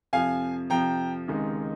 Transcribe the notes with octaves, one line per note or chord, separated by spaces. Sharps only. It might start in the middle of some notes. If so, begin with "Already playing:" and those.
F2 C3 F3 F5 G#5
F2 C3 F3 G5 A#5
C#2 C3 D#3 G#3 D#4